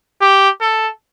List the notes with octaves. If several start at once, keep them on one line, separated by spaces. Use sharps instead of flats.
G4
A4